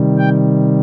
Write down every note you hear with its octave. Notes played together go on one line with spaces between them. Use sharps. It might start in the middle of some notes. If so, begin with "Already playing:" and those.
Already playing: C3 D#3 G3
G5